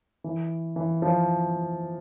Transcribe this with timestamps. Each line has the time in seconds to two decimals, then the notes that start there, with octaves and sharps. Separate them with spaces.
0.24 E3
0.76 E3
1.02 F3